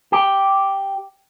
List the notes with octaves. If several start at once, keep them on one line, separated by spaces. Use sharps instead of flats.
G4